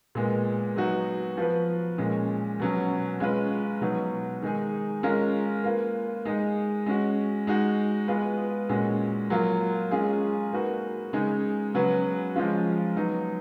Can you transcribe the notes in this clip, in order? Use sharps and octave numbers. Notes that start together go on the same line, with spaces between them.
A#2 G#3 B3
F#3 B3 D#4 F#4
F3 B3 F#4 B4
A#2 G#3 C#4
B2 F#3 C#4
G#3 C#4 F4 B4
B2 F#3 B3 D#4
D#3 G#3 D#4 G#4
G#3 C#4 F4 A#4
A#3 F4 B4
G#3 D#4 G#4
G#3 C#4 F#4
G#3 D#4 F#4
G#3 B3 F4 G#4 B4
A#2 G#3 C#4 F#4
F#3 A#3 F4
G#3 C#4 F4 G#4
A#3 D#4 F#4 B4
C#3 G#3 D#4
C#3 F#3 B3 F#4 B4
F3 G#3 C#4 F4
F#3 B3 D#4